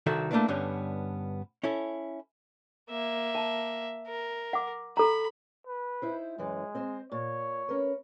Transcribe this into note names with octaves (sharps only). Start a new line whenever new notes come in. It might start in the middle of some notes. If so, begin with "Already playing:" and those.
C2 D#3 F#4 A4 E5
A3 A#3 C4 D4 E4 B4
G2 D3 G3 B3 C#4
C#4 E4 A4
A#3 E5
A5
A#4
F#5 D6
A4 A#5 B5
B4
D#4 E4 C5
F#2 E3 G#3
C4 C5 D#5
A#2 C#5
C#4 A#4 B4